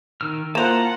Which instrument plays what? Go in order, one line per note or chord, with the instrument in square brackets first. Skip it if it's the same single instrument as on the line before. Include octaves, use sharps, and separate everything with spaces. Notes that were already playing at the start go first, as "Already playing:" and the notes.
[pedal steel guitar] D#3 E6 F6
[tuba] A#3 [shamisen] E4 C5 [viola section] F4 F#5 [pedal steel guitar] A5 A#5